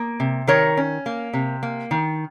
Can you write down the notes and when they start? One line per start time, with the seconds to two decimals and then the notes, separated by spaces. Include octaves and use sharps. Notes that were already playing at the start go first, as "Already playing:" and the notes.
Already playing: A#3
0.20 C3
0.47 D#3 A#4 C#5
0.77 C#4
1.06 A#3
1.33 C3
1.63 A#3
1.91 D#3